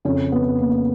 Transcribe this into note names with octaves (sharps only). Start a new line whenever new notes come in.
F2 C#3 C#4
B3
A#3